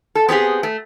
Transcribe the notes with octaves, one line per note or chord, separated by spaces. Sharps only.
A4
B3 C4 G4 G#4
A3